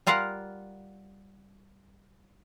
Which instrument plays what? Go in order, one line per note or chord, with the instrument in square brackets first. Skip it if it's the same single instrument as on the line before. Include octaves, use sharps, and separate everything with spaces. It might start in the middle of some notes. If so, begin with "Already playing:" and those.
[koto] G3 F4 A#4 F5 F#5